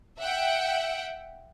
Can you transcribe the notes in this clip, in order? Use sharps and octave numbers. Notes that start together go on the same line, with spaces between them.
E5 F#5 G5